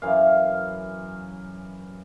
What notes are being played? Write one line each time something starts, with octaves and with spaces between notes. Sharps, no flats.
F#2 E3 F5